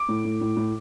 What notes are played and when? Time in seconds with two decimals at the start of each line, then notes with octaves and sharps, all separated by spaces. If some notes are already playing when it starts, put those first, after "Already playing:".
Already playing: D6
0.09 A2
0.25 A2
0.41 A2
0.57 A2